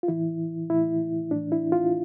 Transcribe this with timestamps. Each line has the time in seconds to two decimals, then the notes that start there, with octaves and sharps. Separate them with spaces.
0.03 F4
0.08 A2 E3 E4
0.70 A2 E3 E4
1.31 A2 E3 D4
1.52 E4
1.72 F4